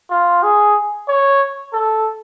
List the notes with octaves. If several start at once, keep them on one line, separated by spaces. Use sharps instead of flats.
F4
G#4
C#5
A4